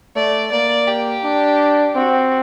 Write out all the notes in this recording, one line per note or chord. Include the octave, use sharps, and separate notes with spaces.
A3 D5
A#3 D5
G4
D4
C4 F#4